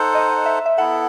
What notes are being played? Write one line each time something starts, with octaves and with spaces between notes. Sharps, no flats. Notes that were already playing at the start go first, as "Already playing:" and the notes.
Already playing: D#4 A4 C5 F#5
D#5
E5
E5
B3 E4 A4 F#5